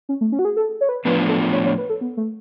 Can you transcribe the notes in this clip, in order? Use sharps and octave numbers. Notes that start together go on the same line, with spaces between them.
C#4
A3
C#4
F#4
G#4
A4
C#5
B4
A2 F3 B3 D4 F4 B4
A4
C#5
C#5
B4
A4
B3
A3